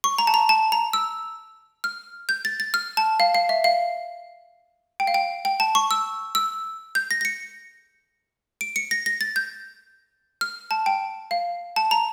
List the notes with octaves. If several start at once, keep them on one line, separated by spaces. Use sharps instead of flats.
C#6
A#5
A5
A#5
A5
A#5
E6
F6
G6
A6
A6
F6
A5
F5
F5
E5
F5
G5
F5
G5
G5
A5
C#6
E6
E6
G6
A#6
A#6
C#7
D7
C#7
A#6
A#6
A6
G6
F6
A5
G5
F5
A5
A#5